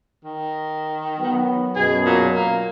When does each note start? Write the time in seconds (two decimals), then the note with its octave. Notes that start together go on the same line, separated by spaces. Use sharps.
0.24 D#3
1.18 F#3 B3
1.76 F#2 B2 G#4
2.05 A#2
2.34 A#3